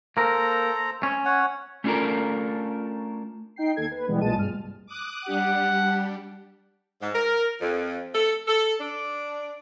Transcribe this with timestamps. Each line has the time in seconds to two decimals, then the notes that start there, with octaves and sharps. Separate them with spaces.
0.17 A#3 A4 A#4 C5 A#5
1.03 C#4
1.25 C#5 F#5
1.84 A3 C#4 D4 F4 A4 A#4
3.56 D#4 G5 C7
3.76 D#2 A4 G#6
3.91 B4
4.08 B2 E3 G3 G#3 B3
4.21 B1 A#2 G#3 G#4 A5 D#7
4.36 C2 G2 F6
4.86 D6 D#6 F#6
5.25 G3 D4 G4 F#5
7.02 G#2
7.15 A#4
7.61 F2
8.15 A4
8.48 A4
8.79 D4